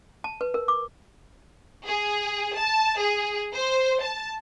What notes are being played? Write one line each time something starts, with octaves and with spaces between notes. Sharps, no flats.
A5
B4
A#4
D6
G#4
A5
G#4
C5
A5